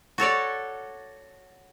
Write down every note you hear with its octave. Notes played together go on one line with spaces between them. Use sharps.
F#4 A4 C#5 D5